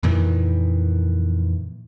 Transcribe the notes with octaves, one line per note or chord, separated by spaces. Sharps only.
F2 A#2 D#3 E3